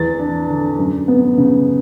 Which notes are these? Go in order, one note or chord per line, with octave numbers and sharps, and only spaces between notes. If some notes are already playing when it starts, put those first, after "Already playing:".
Already playing: E2 A6
D4
D3
F#2
B3
C#3